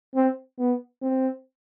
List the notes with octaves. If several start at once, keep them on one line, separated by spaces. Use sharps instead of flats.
C4
B3
C4